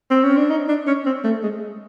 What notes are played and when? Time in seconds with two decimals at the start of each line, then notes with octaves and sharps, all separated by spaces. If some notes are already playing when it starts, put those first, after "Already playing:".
0.11 C4
0.24 C#4
0.37 D4
0.50 D#4
0.69 D4
0.87 C#4
1.06 C4
1.24 A3
1.43 G#3